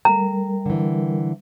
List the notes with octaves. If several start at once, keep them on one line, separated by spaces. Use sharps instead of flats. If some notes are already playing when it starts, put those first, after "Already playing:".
G3 A3 A#4 A#5
D3 E3